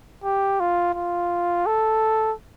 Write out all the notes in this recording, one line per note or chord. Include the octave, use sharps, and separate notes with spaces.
G4
F4
F4
A4